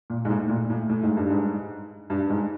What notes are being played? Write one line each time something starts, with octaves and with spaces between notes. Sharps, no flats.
A#2
G#2
A2
A#2
A2
A2
G#2
G2
G#2
G2
G#2